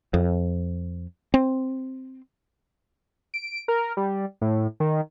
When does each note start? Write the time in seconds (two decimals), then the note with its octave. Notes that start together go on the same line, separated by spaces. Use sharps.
0.14 F2
1.34 C4
3.34 D7
3.68 A#4
3.97 G3
4.42 A2
4.80 D#3